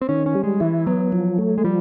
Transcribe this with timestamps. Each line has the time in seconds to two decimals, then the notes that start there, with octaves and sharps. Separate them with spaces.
0.01 C4
0.09 D#3 C#4
0.26 C#4
0.35 G3
0.43 G#3
0.60 E3 E4
0.86 F#3 B3
1.12 F3
1.38 A3
1.58 G#3
1.64 F3 G3